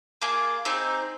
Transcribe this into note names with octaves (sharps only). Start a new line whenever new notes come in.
A#3 F4 G#4
C4 D#4 G#4